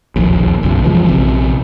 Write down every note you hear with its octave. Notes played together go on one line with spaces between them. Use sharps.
E1 A#1 D#2
F#1 B1
F#1 E3 F3 G#3
A#1 C3